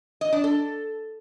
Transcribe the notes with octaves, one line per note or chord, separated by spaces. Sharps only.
D#5
D4
A4